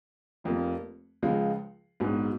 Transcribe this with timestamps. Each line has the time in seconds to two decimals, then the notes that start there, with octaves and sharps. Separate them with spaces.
0.44 F1 F2 F3 A#3 F4
1.22 C#2 C#3 F3 G#3
2.00 A#1 G#2 F#3 B3